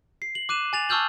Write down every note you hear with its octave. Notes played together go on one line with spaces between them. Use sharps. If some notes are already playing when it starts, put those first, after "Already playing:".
C7
F#7
D6 F#6 D#7 E7
G#5 A6 F7
A5 C#6 E6 F6 G6 F#7